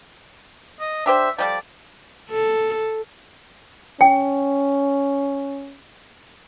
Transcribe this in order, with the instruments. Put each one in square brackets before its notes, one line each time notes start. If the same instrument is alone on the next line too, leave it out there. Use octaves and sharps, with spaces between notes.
[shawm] D#5
[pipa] D4 G4 C5 [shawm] E5
[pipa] F3 G3 A4 [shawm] D5
[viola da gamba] A4
[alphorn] C#4 [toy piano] G5